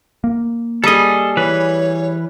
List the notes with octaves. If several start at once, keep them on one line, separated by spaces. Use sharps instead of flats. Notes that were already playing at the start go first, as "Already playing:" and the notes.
A#3
G3 G#4 A4 D#5
E3 B4 C#5